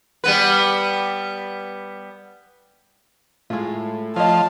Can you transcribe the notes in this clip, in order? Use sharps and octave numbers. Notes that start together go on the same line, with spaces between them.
G3 B3 B4
A2 G#3 F4
F3 C#5 D#5 A5